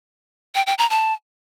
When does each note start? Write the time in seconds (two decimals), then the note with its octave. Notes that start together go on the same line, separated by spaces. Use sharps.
0.55 G5
0.67 G5
0.78 A#5
0.90 A5